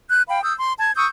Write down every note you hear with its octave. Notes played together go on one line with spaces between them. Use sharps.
F#6 G6
F5 G5 B5
D#6 E6 G6
C6
A5 G#6
C#6 D#6 E6 G6